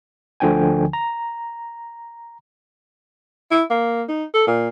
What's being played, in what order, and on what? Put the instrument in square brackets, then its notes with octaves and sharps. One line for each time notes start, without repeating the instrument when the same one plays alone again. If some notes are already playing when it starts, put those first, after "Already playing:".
[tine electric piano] D2 D3 F3 D4 G5 G#5
A#5
[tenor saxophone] E4
A#3
D#4
A4
A#2